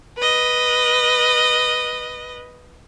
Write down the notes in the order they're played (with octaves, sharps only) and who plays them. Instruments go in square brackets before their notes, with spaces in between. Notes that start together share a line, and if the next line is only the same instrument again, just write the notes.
[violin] B4 D#5